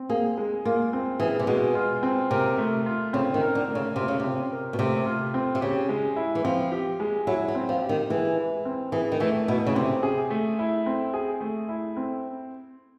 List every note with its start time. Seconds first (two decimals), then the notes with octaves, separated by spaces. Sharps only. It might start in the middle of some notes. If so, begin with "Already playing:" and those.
Already playing: C4
0.10 A#3 G#4
0.38 G#3
0.65 A#3 F4
0.93 C4
1.20 E3 G#4
1.39 C3
1.47 B2 G#3
1.75 F4
2.03 C4
2.31 C3 A#4
2.58 A3
2.86 F4
3.13 C#3 C4
3.34 D#3
3.41 A#4
3.55 D3
3.68 A3
3.75 C#3
3.96 C3 F4
4.08 C#3
4.20 C3 C4
4.52 A#4
4.73 B2
4.79 C3 A3
5.06 F4
5.34 C4
5.55 C3
5.61 C#3 G4
5.89 G#3
6.16 E4
6.35 E3
6.44 F3 C4
6.72 G4
7.00 G#3
7.27 F#3 E4
7.48 F#3
7.55 C4
7.69 F3
7.82 G4
7.89 D#3
8.10 E3 G#3
8.38 E4
8.65 C4
8.92 E3 G#4
9.12 D#3
9.20 E3 A3
9.48 B2 E4
9.67 C#3
9.75 C3 C4
10.03 G#4
10.30 A3
10.59 E4
10.86 C4
11.14 G#4
11.41 A3
11.69 E4
11.97 C4